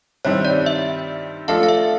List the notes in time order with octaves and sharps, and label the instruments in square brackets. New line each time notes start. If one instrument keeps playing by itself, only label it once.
[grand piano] G2 D#3 G3 C4 E4 [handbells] C#5
[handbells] D5
E5
[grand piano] F3 A3 D4 F4 A4 [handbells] F5
[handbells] F5
E5